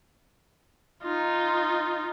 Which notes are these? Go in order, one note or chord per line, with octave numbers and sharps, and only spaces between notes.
D#4 F4